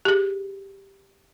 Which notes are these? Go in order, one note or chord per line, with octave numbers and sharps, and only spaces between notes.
G4 G#4